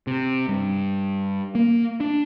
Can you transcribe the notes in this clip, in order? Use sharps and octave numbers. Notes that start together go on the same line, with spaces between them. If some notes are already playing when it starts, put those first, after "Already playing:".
C3
G2
A#3
D4